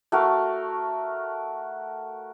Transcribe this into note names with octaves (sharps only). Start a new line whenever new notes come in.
A3 F#4 A#4 F5